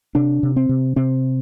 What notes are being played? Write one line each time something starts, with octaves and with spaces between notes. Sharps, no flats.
C3 D4
C3
C4
C3
C3 C4